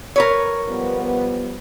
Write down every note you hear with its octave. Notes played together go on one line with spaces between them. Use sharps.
A#4 B4 C#5
F3 G3 B3